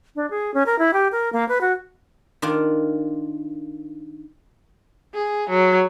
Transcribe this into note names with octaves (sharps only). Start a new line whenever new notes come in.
D4
G#4
C#4
A#4
E4
G4
A#4
A#3
B4
F#4
D#3 D4 F4
G#4
F#3